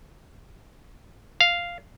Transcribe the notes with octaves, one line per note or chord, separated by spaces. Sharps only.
F5